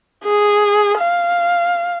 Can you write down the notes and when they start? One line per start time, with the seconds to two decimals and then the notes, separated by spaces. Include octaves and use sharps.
0.24 G#4
0.98 F5